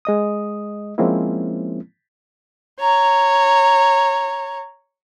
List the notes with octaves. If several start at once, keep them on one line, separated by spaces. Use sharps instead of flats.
G#3 D#5 D#6
F3 G#3 A#3 C4 C#4 E4
C#5 A#5